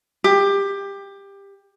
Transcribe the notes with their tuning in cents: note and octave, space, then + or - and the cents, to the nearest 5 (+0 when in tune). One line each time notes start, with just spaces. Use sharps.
G4 +20